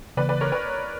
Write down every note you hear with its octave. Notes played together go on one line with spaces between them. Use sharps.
C#3 E3 A#3 B4 D5
B4 D5
A#4 C#5
B4 D5